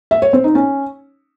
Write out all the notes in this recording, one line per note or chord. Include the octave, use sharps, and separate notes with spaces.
E5
C#5
C4
D#4
C#4